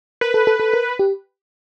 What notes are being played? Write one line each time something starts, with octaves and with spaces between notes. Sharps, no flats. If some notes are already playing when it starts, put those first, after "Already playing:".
A#4 B4
A4
A4
A4
A#4
G4